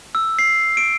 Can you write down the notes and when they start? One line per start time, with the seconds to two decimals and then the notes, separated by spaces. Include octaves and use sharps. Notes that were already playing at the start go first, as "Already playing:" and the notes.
0.15 E6
0.39 C7
0.77 D7